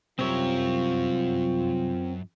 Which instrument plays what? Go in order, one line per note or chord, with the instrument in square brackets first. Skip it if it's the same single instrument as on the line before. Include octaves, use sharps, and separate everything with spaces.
[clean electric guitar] C2 G4 E5 [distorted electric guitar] F#2 A#4 [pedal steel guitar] C4 C#5 [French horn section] F4